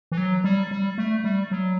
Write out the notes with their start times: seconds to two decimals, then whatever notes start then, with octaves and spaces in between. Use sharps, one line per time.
0.12 E3
0.17 F#3
0.44 G3
0.71 G3
0.98 A3
1.24 G3
1.51 F#3